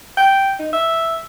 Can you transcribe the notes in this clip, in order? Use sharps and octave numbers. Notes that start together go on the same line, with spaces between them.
G5
D#4
E5